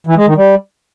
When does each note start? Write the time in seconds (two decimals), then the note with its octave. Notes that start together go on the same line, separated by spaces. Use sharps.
0.07 E3
0.17 G#3
0.27 D#3
0.36 G3